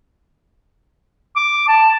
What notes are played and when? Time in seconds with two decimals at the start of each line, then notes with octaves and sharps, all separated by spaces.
1.36 D6
1.68 A5